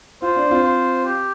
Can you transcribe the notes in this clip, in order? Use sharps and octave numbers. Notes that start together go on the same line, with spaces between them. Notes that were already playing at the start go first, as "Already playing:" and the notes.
F4 C5
D4
C4 F4
C5
G4